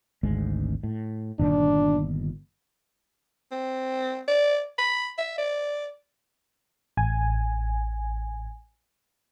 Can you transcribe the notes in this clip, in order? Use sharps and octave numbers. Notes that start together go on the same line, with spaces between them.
G#1 D2 G#3
A2
G1 A#2 D#3 D4
C4
D5
B5
E5
D5
A1 G#5